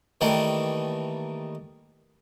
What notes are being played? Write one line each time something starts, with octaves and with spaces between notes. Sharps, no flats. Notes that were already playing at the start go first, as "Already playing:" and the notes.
D#3 E3 G3 A3 A#3